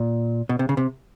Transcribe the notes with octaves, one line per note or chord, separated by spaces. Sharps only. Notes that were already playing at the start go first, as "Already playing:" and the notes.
Already playing: A#2
B2
C3
C#3
C3